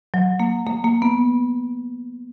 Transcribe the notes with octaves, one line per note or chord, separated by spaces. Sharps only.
F#3
A#3
A#3
A#3
B3